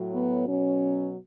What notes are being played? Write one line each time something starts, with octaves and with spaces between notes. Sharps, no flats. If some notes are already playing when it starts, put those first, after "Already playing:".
Already playing: A2 F#3
B3
B2 F#3 C#4